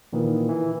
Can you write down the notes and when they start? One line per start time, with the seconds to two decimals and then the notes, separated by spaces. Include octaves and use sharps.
0.13 A#2 D#3 E3
0.49 E3